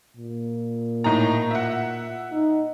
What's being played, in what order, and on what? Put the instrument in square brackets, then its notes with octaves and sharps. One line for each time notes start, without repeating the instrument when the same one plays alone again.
[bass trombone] A#2
[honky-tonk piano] A2 D#4 A#5
E5 F#5
[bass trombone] D#4